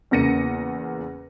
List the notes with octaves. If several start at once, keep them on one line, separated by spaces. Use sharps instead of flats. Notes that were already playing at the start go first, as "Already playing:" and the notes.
E2 C#3 A#3 A#6 C#7 D#7